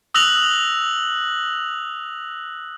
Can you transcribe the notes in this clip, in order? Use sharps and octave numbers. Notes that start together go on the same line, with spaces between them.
D#6 E6 F#6 A#6 F7 F#7